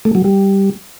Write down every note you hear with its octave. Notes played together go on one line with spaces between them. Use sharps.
A3
F#3
G3